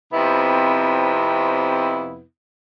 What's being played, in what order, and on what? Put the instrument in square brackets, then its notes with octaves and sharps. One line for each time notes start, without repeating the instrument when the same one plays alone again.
[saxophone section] F2 C3 B3 E4